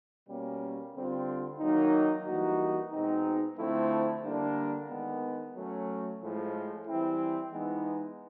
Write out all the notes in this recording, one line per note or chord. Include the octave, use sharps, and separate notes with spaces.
B2 G3 A#3 C#4
D3 G3 C4 F4
D#3 F#3 A#3 D#4
E3 G3 A#3 D#4 F#4
B2 G#3 C4 D#4
D3 F3 A3 C4 E4
D3 G3 A#3 D4
D#3 G#3 B3
F#3 A3 C#4
A2 F3 G#3
E3 G3 C4 E4
E3 G#3 B3 D#4